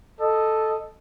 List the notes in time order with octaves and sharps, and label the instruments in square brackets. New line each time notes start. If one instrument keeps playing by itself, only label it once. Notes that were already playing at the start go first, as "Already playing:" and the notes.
[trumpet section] A4 D#5